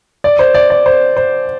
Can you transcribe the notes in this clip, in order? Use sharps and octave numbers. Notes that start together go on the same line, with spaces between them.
D5
C5
D5
D5
C5
C5